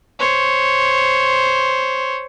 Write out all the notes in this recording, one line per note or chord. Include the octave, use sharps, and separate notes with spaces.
C5 C#5